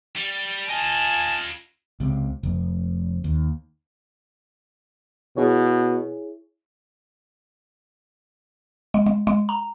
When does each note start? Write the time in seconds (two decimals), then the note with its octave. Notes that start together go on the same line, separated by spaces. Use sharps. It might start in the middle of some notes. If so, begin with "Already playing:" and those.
0.16 G3
0.69 F4 D#5 G#5 A5
2.00 C#2 C3
2.43 F1
3.24 D#2
5.37 B2 E4 G#4 C#5
8.94 G#3
9.06 G#3
9.27 G#3
9.49 A#5